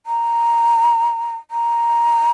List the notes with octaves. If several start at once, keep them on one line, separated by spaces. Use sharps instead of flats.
A#5
A#5